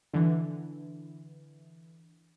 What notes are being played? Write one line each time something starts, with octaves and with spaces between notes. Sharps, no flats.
D3 E3